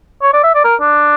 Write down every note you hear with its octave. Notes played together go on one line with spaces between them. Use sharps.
C#5
D5
E5
D5
A#4
D4